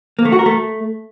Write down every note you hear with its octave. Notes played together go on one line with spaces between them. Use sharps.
A#3
A3
F#4
A#4
A3